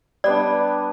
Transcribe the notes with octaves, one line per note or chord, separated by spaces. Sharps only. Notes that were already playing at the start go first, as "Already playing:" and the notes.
G3 B3 D4 D5